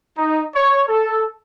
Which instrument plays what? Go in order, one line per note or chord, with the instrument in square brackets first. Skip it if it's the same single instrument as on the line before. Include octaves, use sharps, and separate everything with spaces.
[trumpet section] D#4
C#5
A4